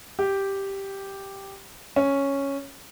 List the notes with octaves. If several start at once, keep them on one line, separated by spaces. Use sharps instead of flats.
G4
C#4